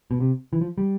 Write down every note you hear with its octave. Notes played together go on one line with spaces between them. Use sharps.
B2
C3
E3
F3
G3